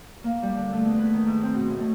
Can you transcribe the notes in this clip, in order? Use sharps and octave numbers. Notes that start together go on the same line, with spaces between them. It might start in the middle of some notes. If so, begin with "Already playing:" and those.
A#3
G3
D3
A3
E2
B4
D#3
G#2
C4
B2
A2
A3